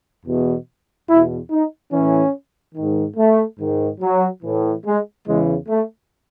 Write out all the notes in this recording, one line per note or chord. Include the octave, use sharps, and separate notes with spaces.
E2 B2
E2 B2 E4
D#4
A2 E3 C#4
G#2 D#3
A3
G#2 D#3
F#3
A2 E3
G#3
E2 C#3 E3 G#3
A3